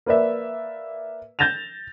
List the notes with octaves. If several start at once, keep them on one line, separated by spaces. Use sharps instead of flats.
A#3 B4 D5 E5
G6 A6 A#6 E7 F7